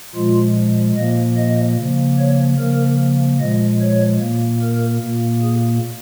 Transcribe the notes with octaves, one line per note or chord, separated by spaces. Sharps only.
A#2 F3 G#3 F4
A#2 F3 A#3 D#5
D#5
C#3 F3 A#3
C#5
C#3 F3 A#3 A#4
A#2 F3 G#3 D#5
C#5
A#2 A#3
A#4
A#2 A#3
G#4